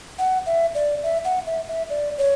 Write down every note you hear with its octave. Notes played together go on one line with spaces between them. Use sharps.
F#5
E5
D5
E5
F#5
E5
E5
D5
C#5